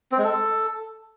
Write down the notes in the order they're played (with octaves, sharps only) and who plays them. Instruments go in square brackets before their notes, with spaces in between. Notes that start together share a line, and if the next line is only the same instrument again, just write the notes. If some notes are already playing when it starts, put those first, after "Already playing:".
[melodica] C4
G#3
A4